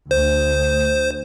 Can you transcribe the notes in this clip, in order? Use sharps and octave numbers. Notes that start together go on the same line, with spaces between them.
D2 C5